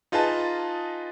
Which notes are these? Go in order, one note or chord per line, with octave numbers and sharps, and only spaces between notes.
D#4 F4 G#4 B4 D#5 A5